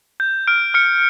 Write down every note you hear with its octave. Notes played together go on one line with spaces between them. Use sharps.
G6
F6 D7
F6 C#7